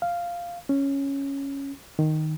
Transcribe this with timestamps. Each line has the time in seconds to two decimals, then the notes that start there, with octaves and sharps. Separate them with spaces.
0.02 F5
0.69 C#4
1.99 D#3